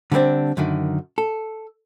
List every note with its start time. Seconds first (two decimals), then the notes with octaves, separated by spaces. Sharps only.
0.12 D3 G3 A#3 C4 D4
0.57 F#2 D3 D#3
1.18 A4